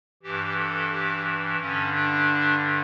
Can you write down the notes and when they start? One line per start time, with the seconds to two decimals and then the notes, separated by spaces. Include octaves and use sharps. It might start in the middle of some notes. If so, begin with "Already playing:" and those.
0.23 G2 E3 G4
0.58 A4
0.91 G4
1.60 G2 D3 C#4
1.94 D4